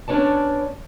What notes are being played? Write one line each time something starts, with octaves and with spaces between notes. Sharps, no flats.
B3 C#4 D4 C#5 D5 A5